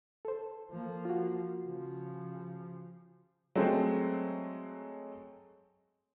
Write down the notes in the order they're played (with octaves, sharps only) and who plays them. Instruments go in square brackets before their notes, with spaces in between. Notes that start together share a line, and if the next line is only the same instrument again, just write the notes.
[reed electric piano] A4 C5
[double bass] F3 A#3
[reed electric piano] F4 F#4
[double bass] C#3 F3
[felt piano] F#3 G#3 A3 C4